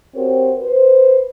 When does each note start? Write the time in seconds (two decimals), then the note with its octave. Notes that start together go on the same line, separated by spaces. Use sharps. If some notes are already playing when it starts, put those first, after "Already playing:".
0.15 C4 F#4 G4 A#4 C5 C#5
0.58 B4 C5